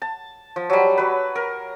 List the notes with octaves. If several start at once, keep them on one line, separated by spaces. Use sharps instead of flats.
A5
F3
F#3 G3
F#3 B4
A#4